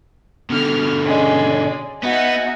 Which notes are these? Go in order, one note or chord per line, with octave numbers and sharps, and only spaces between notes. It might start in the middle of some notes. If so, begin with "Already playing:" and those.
B2 D3 F6
G#3 C#4 D5 G#5
B3 D#4 F#4 E5 F#5 G#5